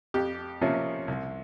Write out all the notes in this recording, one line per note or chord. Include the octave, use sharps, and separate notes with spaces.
F2 G4
C3 F3 A#3 C#4
C2